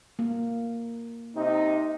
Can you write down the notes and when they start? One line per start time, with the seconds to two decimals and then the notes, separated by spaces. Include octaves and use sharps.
0.19 A#3
1.36 C3 D#4